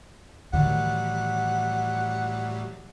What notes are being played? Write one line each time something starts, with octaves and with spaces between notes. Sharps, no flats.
A2 D#3 E3 F#3 G3 F#5